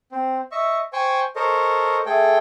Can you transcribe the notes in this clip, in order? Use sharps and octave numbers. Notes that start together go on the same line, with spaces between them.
C4
D#5 E5 C#6
C5 G5 G#5 C#6
A4 A#4 C5 C#5 D#5
A3 G#4 A4 G5